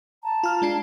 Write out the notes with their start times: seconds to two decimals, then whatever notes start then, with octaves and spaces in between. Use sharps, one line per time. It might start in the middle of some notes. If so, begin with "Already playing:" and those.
0.22 A5 A#5
0.43 F4 F6
0.62 G#3 D4 C7